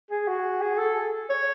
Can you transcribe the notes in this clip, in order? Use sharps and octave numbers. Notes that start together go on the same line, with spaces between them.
G#4
F#4
G#4
A4
C#5